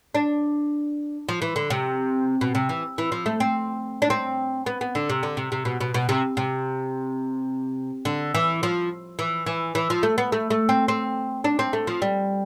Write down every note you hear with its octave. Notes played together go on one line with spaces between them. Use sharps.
D4
F3
E3
D3
C3
B2
C3
E3
E3
F3
A3
C4
D4
C4
B3
B3
D3
C3
D3
C3
C3
B2
B2
B2
C3
C3
D3
E3
F3
E3
E3
E3
F3
A3
B3
A3
A3
C4
C4
D4
C4
A3
F3
G3